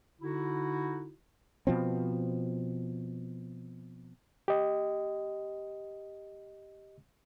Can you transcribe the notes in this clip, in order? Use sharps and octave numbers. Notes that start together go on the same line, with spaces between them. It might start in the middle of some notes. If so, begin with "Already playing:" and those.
D3 D#4 E4 F#4
B2 F3 C4
G4 D#5